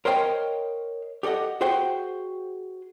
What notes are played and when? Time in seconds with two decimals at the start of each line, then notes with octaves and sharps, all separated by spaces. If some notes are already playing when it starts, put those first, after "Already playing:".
0.05 A#4 C5 C#5 D#5 F5 G5
1.23 G4 A4 D5 D#5 F#5
1.61 F#4 G#4 C5 F#5 G5